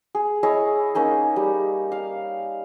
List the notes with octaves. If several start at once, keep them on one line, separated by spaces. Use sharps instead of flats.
G#4
E4 G#4 C#5 D#5
A#3 C#4 D#4 G#4
G3
F5